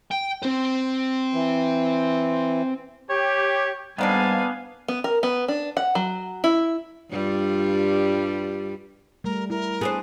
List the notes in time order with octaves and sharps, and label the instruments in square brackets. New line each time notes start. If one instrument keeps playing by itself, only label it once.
[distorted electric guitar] G5
C4 C5
[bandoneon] E3
[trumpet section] G4 [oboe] C#5
[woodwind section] G#2 G3 [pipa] D#3 A#3 D4 [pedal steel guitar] B3 [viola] F5 G#5
[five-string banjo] B3
A#4
B3
D4
F#5
F#3
E4
[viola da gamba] G2 G3 F4
[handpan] G3 A3 [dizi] A#4
[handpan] E4 [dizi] A#4
[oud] B3 D4 C5 [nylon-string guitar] G#4